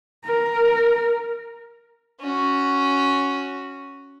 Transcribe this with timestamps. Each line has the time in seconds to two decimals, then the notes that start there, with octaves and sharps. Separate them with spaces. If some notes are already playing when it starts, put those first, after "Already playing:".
0.25 A#4
2.20 C#4 F#4